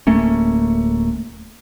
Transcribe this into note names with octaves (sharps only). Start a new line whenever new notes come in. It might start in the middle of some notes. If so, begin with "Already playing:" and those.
D1 A3 A#3 C#4